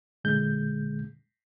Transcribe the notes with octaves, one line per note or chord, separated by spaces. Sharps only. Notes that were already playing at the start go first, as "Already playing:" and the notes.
A#2 D3 G#3 G6